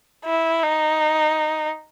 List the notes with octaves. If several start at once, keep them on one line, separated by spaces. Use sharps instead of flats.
E4
D#4